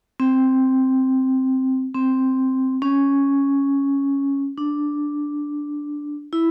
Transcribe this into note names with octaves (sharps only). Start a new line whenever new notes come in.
C4
C4
C#4
D4
E4